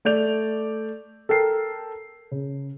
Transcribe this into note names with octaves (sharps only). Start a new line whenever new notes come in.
A3 D5 G6 F7
A4 A#4 G5 C7
C#3